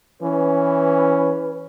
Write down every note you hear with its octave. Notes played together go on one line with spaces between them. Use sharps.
E3 C#4 B4